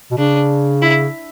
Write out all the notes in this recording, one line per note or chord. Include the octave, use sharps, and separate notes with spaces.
B2
C#3 D4
E4